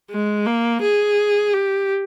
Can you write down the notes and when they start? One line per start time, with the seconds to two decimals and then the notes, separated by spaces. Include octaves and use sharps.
0.11 G#3
0.46 A#3
0.82 G#4
1.53 G4